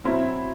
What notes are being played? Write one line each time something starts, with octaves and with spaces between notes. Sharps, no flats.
B2 F#3 C4 E4